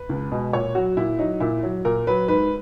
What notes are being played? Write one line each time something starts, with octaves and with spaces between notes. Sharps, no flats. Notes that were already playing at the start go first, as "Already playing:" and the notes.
Already playing: B4
C#2
B2 G#3
A#2 C#5
F#3 F#4
A#2 E4
F#3 D#4
A#2 E4
F#3
A#2 A#4
F#3 B4
G#2 B4